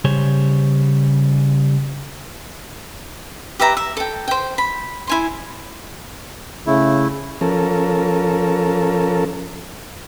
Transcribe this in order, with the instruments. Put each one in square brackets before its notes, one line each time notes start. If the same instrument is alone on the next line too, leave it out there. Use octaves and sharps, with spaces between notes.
[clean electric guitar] C#3 G3 C5 C#5
[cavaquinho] G4 B4 E5 A#5
E5
A4 G5
C5 G5
B5
E4 G#5 C6
[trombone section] C#3 [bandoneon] A3 E4
[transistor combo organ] F3 C#4 A4 A#4